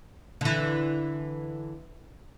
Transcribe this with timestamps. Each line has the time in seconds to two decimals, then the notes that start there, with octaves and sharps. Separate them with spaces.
0.41 D3 E3